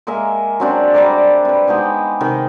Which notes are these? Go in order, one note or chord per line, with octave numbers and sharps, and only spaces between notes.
G#3 A#3 A#4 E5
F#3 C4 D4
G3 D5 A#5 D6
C4 B4
G#3 B3 D#4 G4
C3 D#3 G5